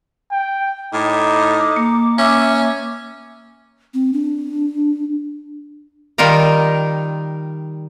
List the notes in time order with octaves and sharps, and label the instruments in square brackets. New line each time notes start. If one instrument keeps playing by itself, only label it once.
[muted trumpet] G5
[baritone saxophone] A2 [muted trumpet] D#4 [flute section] D6
[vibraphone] A#3
[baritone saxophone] C#4 [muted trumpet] E5
[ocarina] C4
D4
[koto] D#3 G3 D#4 F4 A#4